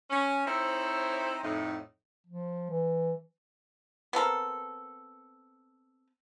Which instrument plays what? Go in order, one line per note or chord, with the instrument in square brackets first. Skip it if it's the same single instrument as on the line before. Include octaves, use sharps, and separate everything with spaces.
[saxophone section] C#4
C4 D#4 E4 A4 C5 C#5
F2 A2 D#4
[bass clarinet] F3
E3
[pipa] B3 C4 A4 A#4